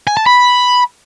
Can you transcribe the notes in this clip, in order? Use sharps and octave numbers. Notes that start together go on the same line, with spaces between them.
G#5
A5
B5